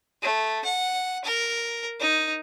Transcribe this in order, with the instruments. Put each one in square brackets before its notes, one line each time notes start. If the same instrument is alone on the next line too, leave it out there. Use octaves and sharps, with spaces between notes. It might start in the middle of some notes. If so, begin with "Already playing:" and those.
[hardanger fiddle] A3
F#5
A#4
D#4